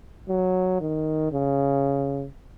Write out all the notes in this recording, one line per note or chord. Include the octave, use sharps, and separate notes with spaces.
F#3
D#3
C#3